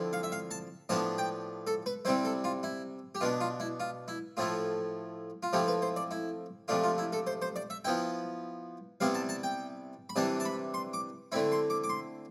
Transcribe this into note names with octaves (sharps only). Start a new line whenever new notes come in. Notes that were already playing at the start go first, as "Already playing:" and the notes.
Already playing: D3 F3 C4 E4
F5
E5
F5
A5
A2 F3 B3 D4 A5
G5
A4
B4
C3 G3 C4 E4 C5
A4
F4
E4
G4
B2 B3 D4 F4
F4
E4
F4
E4
A2 F3 A3 E4 F4
F4
F3 A3 C4 E4 G4
B4
C5
D5
E4
C3 F3 A3 D4 F4
F4
E4
A4
C5
C5
D5
E5
F3 B3 E4 G5
C3 G3 B3 E4 F5
A5
A5
G5
B5
C3 E3 G3 D4 A5
A5
B5
C6
D6
D3 A3 C4 E4 B5
C6
D6
D6
C6